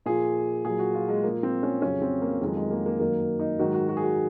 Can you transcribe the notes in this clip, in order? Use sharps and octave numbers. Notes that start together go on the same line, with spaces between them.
A#2 F3 G#4
A#2 F#3 G#4
F#4
F4
G#3
A#2 F3 A#3
C4
C#4
F2 C#3 F#3 C#4
C4
A#3
F2 D#3 F#3 G#3
G#3
A#3
A#3
F#2 D#3 F#3 A#3
D#4
G#2 D#3 F#3 F#4
F#4
F#4
G#4
F#4